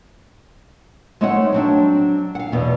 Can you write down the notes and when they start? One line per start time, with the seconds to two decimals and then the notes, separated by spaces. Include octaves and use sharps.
1.21 G#3 A3 C4 D#4 C#5 F#5
1.52 F#3 C4 D4
2.35 F5 F#5
2.52 E2 B2